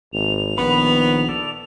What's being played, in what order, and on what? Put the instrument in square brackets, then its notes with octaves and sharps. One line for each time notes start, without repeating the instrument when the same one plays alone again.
[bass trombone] G#1 [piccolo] F7
[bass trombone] A#1 [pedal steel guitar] D#3 B5 [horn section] B3
[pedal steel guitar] A4 D5